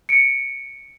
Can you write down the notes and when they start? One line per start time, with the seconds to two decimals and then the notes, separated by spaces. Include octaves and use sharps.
0.09 C#7 D7